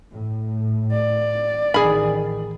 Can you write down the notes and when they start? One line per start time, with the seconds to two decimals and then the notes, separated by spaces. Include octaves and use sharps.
0.10 A2
0.91 D5
1.74 A1 D#3 G#4 B5